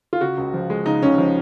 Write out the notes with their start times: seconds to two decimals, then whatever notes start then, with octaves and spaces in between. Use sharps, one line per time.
0.13 F4
0.21 C#3 F#4
0.37 C#2
0.54 F3
0.70 G#3
0.86 C#3 D#4
1.02 C#2 C#4
1.18 F3